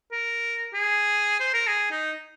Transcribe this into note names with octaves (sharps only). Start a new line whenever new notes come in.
A#4
G#4
C5
A#4
G#4
D#4